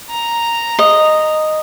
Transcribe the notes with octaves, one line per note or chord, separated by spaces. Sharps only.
A#5
D#5